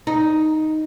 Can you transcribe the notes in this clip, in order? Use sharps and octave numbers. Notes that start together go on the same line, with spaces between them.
D#4